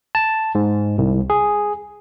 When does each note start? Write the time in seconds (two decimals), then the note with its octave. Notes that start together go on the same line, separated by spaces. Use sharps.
0.15 A5
0.55 G#2
0.98 C2
1.30 G#4